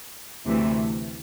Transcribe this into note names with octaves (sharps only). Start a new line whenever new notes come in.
D2 C3 E3 A3